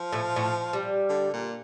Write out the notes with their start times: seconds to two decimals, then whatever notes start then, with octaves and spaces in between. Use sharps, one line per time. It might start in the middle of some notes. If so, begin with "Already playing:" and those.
Already playing: F3
0.12 A2 A3
0.36 A2 A3
0.73 G3
1.09 D3
1.34 A#2